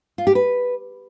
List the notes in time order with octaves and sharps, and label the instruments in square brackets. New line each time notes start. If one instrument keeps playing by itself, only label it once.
[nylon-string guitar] F4
G4
B4